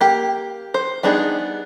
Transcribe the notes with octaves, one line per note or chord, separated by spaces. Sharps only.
A#3 G4
C5
G3 B3 D4 D#4 G#4